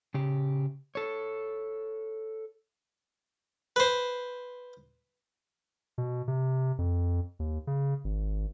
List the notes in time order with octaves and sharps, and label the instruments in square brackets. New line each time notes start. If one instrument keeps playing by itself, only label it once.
[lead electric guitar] C#3 G4
A4 C#5
[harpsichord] B4 C5
[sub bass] B2
C3
F2
D#2
C#3
G#1